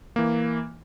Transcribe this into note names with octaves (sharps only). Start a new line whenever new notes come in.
E3 A#3